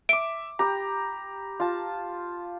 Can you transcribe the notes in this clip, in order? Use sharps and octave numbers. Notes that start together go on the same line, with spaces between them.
E5 D6 D7
G4 G5 A#5 B5
F4 A5